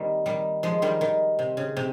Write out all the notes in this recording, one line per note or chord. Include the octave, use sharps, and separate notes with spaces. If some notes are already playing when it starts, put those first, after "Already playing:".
Already playing: D#3 G3 A#3 C4
D#3 G3
F3 G#3
D#3 G3
D#3
C3
C#3
C3